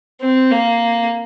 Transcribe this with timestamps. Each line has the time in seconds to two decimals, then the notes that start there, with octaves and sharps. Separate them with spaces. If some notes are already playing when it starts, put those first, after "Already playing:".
0.21 C4
0.51 A#3